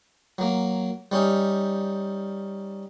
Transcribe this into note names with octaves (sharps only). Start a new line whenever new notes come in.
F#3 A#3
G3 C#4 D#4